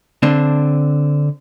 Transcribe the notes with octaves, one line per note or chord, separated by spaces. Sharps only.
D3 C4 D4